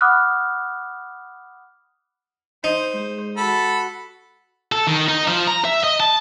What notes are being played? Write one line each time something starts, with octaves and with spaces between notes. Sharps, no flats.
F#5 B5 D6 D#6 F6 F#6
D#4 C5
G#3 C5
F#4 A4 B5
A4
D#3
D#4
F3
A#5
E5
D#5
A5